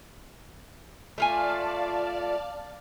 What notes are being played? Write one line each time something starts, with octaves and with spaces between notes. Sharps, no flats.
A3 F4 D5 F5 G#5 A5